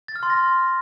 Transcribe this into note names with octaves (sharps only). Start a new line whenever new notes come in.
A6
F6
C6
A#6